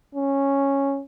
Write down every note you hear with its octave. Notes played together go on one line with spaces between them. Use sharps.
C#4